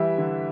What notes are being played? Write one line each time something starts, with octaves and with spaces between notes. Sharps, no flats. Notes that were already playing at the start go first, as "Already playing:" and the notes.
Already playing: E3 G3 E5
D3